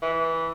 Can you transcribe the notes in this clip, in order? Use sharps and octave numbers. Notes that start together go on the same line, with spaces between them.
E3